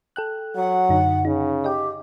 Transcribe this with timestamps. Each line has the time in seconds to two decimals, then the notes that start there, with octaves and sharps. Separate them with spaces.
0.16 A4 G5 F#6
0.56 F#3 F#5
0.89 F#2 D3 D#4
1.25 C#3 D#4
1.64 G4 D#5 G5